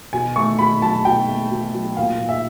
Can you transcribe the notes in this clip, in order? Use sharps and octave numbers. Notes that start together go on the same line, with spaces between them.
B2 G#5
A3 C#6
B2 B5
F#3 A5
B2 G5
A3
B2
F#3
A#2 F5
A#2
E5